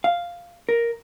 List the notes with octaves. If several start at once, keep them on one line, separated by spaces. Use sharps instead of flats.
F5
A#4